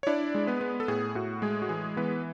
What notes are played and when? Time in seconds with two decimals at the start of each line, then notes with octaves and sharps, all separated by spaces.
0.03 C#5
0.07 D4 E4 D5
0.35 G#3
0.47 B3 B4
0.61 B3
0.80 A4
0.88 A2 G#4
1.15 A2 F#4
1.42 G#3 G#4
1.62 F#4
1.69 E3 G#4
1.97 E3 B3 B4